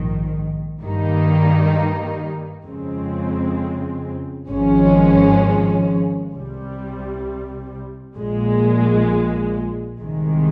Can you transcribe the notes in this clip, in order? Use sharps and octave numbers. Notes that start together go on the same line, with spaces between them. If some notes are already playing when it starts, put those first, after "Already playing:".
Already playing: A#1 G#2 D#3
G2 D#3 G3 A#3 D#4
F2 C#3 G#3 C4
G#1 G#2 F3 G#3 C#4
C2 C3 G3
A#1 A#2 G#3
C2 C3 D#3 G#3